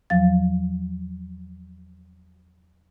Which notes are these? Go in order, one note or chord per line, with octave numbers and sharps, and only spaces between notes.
E2 F3 F#3 F5 A6